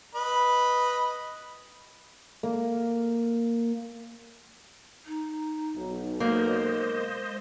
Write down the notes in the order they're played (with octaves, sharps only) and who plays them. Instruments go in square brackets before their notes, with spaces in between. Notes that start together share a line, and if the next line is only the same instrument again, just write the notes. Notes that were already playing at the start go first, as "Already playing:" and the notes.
[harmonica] B4 D#5 B5
[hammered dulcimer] A#3
[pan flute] D#4
[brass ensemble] B1
[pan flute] G#3 [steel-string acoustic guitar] A#3 [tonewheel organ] C5 D#5